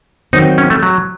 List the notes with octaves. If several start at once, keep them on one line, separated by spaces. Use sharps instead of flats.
D#3 F#3 C4 D#4
C#4
A3
F#3